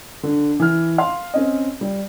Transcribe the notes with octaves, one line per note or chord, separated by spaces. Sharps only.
D3
E3 F6
F5 C6
C4 C#4 D#5
G3